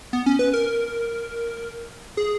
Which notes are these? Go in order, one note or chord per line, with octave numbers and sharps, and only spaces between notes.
B3
C#4
B4
A#4
G#4